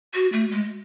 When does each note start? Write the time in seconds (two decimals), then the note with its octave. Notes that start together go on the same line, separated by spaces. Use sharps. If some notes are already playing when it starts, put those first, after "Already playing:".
0.14 F#4
0.33 A3
0.51 G#3